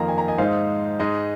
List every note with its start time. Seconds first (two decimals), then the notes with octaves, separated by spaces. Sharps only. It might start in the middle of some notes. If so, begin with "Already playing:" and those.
Already playing: F2 D#3 A#3 F5 A#5
0.08 G#5
0.18 A#5
0.28 D#5 G#5
0.38 G#2 G#3 D#4 C5 F5
0.99 G#2 G#3 D#4 D#5